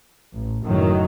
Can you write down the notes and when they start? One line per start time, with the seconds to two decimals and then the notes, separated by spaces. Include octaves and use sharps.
0.33 A1
0.64 F#1 A2 D#3 F#3